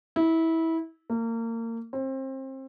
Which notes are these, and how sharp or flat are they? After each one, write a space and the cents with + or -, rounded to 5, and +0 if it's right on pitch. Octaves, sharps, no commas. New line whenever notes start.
E4 -20
A#3 -30
C4 +30